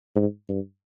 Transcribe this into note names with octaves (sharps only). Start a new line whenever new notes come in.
G#2
G2